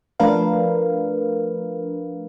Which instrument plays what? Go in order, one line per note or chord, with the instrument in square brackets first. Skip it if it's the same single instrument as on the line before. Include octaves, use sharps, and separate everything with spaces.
[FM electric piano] F3 A3 D4 A#4 B4 F5